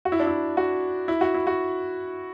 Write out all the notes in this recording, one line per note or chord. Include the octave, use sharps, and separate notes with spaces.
F#4
E4
D4
E4
F#4
E4
F#4
E4
F#4